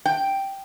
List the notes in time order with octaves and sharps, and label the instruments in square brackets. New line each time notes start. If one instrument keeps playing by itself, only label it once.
[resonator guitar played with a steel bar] G5